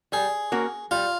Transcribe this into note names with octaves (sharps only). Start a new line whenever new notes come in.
G3 G#4
A#3 C#4 F#4 A#4
G3 F4